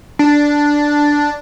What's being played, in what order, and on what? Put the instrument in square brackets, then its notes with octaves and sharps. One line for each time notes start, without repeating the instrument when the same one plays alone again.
[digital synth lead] D4